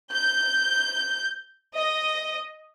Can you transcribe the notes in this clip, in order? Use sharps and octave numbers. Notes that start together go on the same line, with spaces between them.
G6
D#5